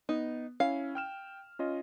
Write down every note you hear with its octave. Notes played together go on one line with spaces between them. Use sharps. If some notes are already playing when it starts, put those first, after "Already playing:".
B3 D#4
C#4 E4 F5
G5 F6 E7
C#4 F4 D#5